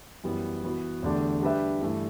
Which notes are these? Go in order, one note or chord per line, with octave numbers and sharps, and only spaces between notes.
F#2 E3 G3 B3
E3 B3 F#4
E2 D3 A3 D4 G4
G3 D4 G4 B4 E5
G2 E3 A3